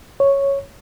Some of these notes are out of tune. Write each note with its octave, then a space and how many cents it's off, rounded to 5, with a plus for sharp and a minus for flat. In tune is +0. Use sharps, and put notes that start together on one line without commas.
C#5 +0